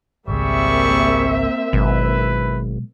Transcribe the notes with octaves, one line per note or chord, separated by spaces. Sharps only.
G#1 C#2 G3 A#3 C4 G#4 E5 C#6
G#1 B2 F#3 G#3 E4 B4